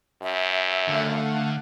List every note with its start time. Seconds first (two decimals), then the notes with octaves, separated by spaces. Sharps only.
0.23 F#2 E5
0.88 D3 A3 F5 F#5